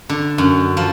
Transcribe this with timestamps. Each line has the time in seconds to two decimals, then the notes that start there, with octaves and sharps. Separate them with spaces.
0.09 D3
0.38 F#2
0.77 F3